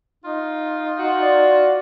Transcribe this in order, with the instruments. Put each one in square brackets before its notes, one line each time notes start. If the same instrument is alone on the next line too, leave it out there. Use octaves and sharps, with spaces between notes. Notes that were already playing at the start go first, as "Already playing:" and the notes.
[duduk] D#4 [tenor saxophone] F4
[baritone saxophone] F#4
[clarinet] D5